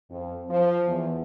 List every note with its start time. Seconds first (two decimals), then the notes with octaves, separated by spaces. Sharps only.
0.11 F2
0.49 F3
0.87 E2